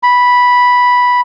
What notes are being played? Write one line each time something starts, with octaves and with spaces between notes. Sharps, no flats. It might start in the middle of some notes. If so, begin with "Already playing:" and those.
B5